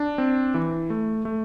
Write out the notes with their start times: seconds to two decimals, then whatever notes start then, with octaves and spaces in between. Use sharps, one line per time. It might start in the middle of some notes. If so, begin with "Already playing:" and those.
Already playing: D4
0.18 C4
0.54 E3
0.90 A3
1.25 A3